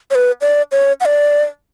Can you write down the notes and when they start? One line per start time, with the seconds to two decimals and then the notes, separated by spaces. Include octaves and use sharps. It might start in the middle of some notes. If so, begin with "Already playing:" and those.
0.11 C#5
0.15 B4
0.41 D5
0.72 C#5
1.01 F#5
1.05 D5